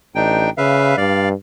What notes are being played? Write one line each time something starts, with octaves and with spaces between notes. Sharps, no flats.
A1 D4 D#4 G5
C#3 B4 E5 F5
G2 D5 F5